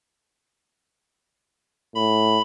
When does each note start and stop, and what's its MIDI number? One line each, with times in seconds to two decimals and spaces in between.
1.95 2.39 45
1.95 2.42 83